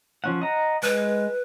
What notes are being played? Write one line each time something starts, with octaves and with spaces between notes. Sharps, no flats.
F3 C#4 F#5
D#5 F#5 A#5
G#3 B4